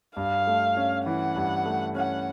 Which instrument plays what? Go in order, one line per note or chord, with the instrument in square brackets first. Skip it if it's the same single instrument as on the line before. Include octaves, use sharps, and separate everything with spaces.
[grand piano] G2 [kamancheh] F5
[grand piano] A3
C#4
[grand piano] E3 [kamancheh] F#5
[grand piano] G2
A3
[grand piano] C#4 [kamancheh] F#5